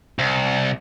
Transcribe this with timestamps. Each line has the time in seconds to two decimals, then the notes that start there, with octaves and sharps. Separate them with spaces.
0.19 C2